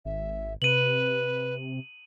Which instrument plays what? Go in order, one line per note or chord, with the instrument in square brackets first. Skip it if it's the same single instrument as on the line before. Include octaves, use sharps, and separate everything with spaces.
[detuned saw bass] G#1 [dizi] E5
[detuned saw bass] C3 [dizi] B4 [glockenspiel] D#7 F#7